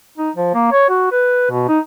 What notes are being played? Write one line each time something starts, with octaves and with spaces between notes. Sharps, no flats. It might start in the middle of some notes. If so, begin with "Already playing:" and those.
D#4
F3
A#3
C#5
F#4
B4
B2
D#4